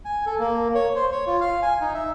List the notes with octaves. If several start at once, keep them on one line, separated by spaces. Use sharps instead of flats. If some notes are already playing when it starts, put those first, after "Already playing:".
G#5
A4
A#3
C#5
C5
C#5
F4
F5
G#5
D#4
E5